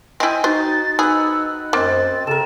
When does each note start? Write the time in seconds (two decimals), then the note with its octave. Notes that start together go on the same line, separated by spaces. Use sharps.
0.20 C4 E4 D#5 G5 G#5
0.44 D#4 F#4 C5 A6
0.99 D#4 G#4 B4 F#5 E6
1.73 F#2 A#3 C4 D#5 A6
2.27 C#3 A4 A#4 E7